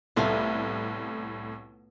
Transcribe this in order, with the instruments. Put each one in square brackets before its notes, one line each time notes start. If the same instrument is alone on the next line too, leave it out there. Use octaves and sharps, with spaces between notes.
[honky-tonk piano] C2 A2 [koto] A3 B3 F4